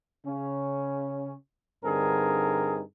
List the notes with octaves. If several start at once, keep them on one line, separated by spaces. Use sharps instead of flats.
C#3 C#4
G2 D3 C4 D#4 G#4 A#4